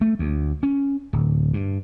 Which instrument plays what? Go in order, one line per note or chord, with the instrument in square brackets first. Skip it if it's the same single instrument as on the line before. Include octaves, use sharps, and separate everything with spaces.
[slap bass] A3
D2
C#4
D1
G2